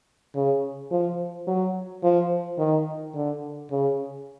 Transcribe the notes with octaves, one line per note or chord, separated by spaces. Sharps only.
C#3
F3
F#3
F3
D#3
D3
C#3